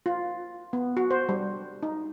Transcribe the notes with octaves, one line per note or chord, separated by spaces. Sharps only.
F4
B3
F#4
C5
G3
D#4